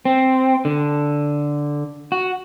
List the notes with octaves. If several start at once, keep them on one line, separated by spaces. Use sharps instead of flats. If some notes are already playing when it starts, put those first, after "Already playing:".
C4
D3
F#4